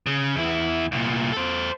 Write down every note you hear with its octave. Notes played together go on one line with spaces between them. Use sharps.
C#3
E2 E4
C2 A#2
A4 C5